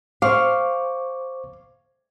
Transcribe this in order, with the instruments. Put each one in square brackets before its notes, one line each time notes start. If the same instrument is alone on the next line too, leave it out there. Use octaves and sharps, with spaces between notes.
[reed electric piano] C5 C#6 D6 [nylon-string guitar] F5